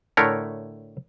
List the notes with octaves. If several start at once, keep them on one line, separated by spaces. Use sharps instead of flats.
A2 D3 A3 A#4 C#5